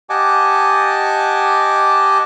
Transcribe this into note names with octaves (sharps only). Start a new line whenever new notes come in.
G4 D#5 F#5 G#5 A5 D6